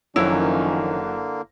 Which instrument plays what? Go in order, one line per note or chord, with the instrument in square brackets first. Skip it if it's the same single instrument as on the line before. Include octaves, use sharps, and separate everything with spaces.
[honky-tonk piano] F#1 F#3 [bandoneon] D3 A#3 [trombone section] D#3 F3 C#4 [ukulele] E4